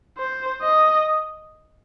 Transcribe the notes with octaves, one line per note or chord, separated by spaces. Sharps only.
C5
D#5